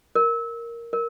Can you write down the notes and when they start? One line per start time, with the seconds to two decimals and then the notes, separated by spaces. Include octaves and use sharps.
0.15 A#4
0.93 A#4